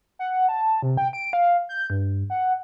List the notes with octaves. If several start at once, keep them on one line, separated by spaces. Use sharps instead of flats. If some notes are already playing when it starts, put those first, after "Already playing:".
F#5
A5
C3
G5
D7
F5
G6
G2
F#5